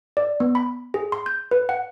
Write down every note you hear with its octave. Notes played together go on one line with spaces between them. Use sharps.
D5
B3
B5
G#4
C6
G6
B4
F#5